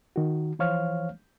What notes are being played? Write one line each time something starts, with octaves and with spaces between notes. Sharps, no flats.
D#3 F#4
E3 F3 C5 C#5 F5 F6